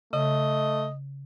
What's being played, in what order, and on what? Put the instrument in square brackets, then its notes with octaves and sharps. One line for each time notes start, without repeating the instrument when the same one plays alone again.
[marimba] C#3 [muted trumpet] A3 [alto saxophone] D#5